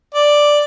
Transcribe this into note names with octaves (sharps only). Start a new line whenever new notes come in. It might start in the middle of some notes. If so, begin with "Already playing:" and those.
D5